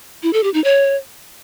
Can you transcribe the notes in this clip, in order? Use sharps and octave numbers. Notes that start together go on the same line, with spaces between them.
E4
A4
G4
D#4
C#5